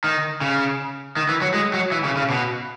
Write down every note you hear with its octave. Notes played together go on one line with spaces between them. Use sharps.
D#3
C#3
D#3
E3
F#3
G#3
F#3
E3
C#3
C#3
B2